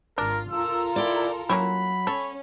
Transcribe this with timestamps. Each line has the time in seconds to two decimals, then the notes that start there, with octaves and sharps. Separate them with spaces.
0.18 G#1 D4 F4 A#4
0.51 F4 A4 A#4 E6
0.96 E4 D5 G5
1.49 F#3 A#3 C#4 E4 B5
2.07 C#4 A4 C#5